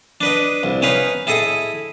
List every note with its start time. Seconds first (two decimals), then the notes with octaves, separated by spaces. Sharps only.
0.21 D4 B4 D#5
0.63 C2
0.82 C#4 D#4 B4 F5
1.27 E4 G#4 A4 D#5 D#6